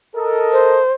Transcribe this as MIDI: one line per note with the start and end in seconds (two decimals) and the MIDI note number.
0.16 0.81 69
0.16 0.81 70
0.16 0.81 75
0.52 0.92 72